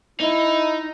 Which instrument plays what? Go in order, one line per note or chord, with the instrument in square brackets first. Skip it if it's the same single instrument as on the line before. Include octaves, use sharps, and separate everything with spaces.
[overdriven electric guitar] D#4 [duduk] E4